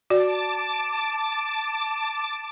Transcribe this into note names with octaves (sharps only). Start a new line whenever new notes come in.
F#4 D5 A5 D6